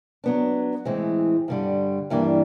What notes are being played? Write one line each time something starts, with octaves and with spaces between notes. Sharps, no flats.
F#3 B3 D4
A2 E3 G#3 C4
G2 D3 G3
G2 E3 G3 A#3 D4